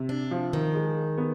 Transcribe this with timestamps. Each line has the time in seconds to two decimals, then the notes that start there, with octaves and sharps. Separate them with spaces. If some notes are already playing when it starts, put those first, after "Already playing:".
Already playing: C3
0.09 D4
0.31 F3
0.53 D#3
0.74 G#3
1.18 B3